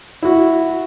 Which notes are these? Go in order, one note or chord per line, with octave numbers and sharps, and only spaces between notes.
E4 F#4